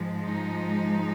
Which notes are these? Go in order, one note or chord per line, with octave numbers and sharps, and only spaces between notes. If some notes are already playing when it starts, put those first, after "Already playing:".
Already playing: G#2 F3 G#3
D#4